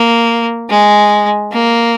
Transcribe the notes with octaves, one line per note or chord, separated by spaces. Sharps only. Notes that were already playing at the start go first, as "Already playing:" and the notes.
Already playing: A#3
G#3
A#3